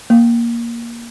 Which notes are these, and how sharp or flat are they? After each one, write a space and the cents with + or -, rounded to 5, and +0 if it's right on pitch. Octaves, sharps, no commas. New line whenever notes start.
A#3 +10